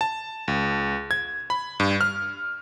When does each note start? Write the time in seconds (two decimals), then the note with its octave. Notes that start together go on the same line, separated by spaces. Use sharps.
0.01 A5
0.48 C#2
1.11 G#6
1.50 B5
1.80 G2
2.01 F6